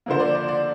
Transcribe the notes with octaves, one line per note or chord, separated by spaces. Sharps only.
D3 F3 A#3 C5
D5
D5
D5